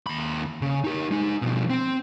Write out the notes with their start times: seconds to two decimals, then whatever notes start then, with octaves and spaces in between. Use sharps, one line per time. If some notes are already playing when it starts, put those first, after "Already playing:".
0.07 D#2 B5
0.61 C#3
0.85 D#4 G4
1.11 G#3 D#4
1.42 B2 F3
1.70 C4